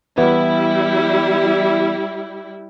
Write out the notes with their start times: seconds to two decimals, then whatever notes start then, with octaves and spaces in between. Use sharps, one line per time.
0.18 E3 G3 B3 E4